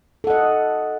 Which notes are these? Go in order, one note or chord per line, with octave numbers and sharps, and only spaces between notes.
A4 D#5 F#5